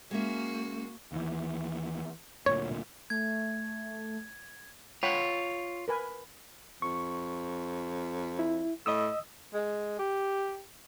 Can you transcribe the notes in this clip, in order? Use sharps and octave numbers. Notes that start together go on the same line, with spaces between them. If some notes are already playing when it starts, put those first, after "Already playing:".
G#3 A#3 C#4 F#4 E5
D#2 E3
D2 A#2 C#5
A3 G#6
F4 C#5 F#5 G5 B5
A#4 B4 G#5
F2 C#6
E4
A2 D#5 D#6 E6
G#3
G4